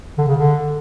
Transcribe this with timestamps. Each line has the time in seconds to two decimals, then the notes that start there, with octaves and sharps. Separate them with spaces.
0.18 D3
0.28 C#3
0.38 D3